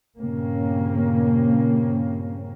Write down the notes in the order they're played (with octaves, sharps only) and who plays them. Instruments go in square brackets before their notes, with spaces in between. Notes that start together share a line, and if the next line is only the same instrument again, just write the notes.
[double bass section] G2 A#2 C#3 A#3 C4 C#4